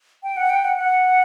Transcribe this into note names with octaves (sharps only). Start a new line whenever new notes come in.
G5
F#5
G5
F#5
F#5